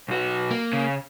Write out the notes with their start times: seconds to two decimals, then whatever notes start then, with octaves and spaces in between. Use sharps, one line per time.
0.08 B1 F#4
0.51 A#3
0.73 C#3